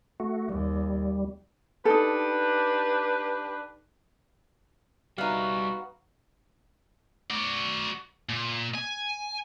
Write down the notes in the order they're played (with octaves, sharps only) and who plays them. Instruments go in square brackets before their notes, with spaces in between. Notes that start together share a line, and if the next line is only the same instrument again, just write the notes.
[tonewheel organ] A3 F#4
[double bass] D#2 [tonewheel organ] G3
[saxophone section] D4 G4 B4 [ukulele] D#4 A4
[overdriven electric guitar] G3 E5 [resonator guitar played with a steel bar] B3 D#4 [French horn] F#4 [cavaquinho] F5
[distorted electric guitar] F#4 D5
A#2
G#5